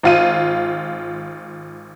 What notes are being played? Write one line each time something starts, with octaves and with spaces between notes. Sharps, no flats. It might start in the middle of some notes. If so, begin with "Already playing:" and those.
G#1 F4 D#7